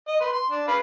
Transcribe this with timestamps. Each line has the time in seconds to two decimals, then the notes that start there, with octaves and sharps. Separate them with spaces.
0.08 D#5
0.21 B4 C6
0.32 C6
0.50 D4
0.68 B4 F5 B5